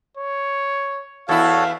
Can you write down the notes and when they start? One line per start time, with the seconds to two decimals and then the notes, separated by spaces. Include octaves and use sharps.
0.18 C#5
1.29 E2 E4 F#4 A4 C#5 F5